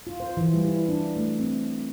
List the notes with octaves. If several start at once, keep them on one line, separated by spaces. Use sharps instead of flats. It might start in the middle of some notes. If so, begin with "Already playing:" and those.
F4
C5
E3
G3
E4
D4
A3
C4